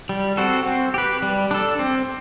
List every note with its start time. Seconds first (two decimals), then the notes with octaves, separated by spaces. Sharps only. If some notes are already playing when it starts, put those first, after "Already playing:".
0.09 G3
0.37 C4 F#4 A4
0.66 C4
0.94 G4 B4
1.22 G3
1.51 D4 A4
1.79 C4